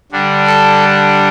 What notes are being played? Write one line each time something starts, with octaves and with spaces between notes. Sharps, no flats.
D3 G3 D4
A4